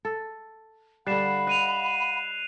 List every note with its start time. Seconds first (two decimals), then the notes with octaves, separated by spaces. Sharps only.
0.05 A4
1.07 D3 G3 F5 F#5 B5 F#6 C7 E7
1.47 D#5 F#6 D#7 F7